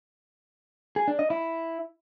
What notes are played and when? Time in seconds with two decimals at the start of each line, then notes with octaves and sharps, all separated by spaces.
0.96 G#4
1.08 D4
1.19 D#5
1.30 E4